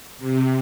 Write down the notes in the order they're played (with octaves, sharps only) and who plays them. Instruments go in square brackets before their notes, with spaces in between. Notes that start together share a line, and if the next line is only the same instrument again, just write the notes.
[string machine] C3